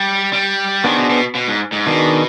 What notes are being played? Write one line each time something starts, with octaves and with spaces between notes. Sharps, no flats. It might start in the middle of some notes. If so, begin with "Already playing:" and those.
Already playing: G3
G3
D#3 B3 D4 G#4 C5
B2
B2
B2
G#2
G#2
B2 D#3 B3 D4 G#4